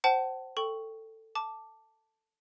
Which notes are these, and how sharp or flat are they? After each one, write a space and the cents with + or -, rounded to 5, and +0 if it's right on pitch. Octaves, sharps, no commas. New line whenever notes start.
C5 +0 F#5 +40 A5 +0
A4 +15 G5 +0 C#6 +0
A5 +5 D6 +0